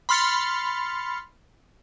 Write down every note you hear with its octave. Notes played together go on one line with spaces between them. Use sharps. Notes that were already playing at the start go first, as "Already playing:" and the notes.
B5 C6 F6 A6 C#7